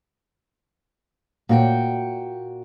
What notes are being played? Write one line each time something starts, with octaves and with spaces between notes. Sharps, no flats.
A#2 F#4 G5